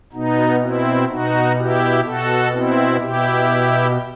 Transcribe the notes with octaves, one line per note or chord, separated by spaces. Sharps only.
B2 B3 D#4
C4 E4
B2 D#4 F#4
E4 G4
B2 F#4 A4
C4 E4
B2 E4 G4